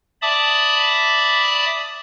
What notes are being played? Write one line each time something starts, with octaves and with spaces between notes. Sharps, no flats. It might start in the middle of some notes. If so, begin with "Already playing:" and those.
D5 E5 A5 B5 D6 D#6